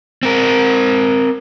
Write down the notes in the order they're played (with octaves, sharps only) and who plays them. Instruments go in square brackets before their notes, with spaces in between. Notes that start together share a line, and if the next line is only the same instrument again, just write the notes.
[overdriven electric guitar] C4 A#4